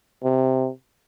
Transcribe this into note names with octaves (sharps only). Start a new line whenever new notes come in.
C3